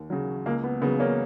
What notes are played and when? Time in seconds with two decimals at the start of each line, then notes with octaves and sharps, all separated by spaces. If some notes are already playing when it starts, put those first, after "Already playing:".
Already playing: D#2
0.10 C#3 F#3
0.46 C#2 A#3
0.64 B3
0.82 C#3 B3
0.85 F#3
1.00 A#3 C#4